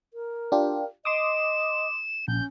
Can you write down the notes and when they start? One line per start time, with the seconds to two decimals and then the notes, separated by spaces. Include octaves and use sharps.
0.14 A#4
0.52 D4 F4 G4
1.05 D#5 C6 D6 D#6 E7
2.28 A#1 C#4 G6